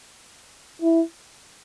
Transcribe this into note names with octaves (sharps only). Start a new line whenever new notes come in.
E4